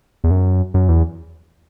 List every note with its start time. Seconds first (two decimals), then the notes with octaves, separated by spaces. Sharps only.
0.24 E2
0.31 F#2
0.74 F#2
0.89 E2